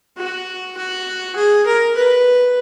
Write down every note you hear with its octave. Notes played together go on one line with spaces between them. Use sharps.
F#4
F#4
G#4
A#4
B4